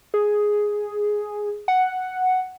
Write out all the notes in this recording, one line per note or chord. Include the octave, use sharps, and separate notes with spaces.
G#4
F#5